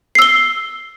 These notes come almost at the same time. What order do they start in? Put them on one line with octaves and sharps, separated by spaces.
C7 E6 G7